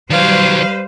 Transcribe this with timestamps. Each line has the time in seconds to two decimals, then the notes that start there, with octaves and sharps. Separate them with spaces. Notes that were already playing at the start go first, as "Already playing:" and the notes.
0.10 D#3 F#3 G3 B4 C5 F5